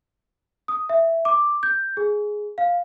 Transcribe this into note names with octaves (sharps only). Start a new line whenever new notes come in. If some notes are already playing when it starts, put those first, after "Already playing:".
D#6
E5
D6
G6
G#4
F5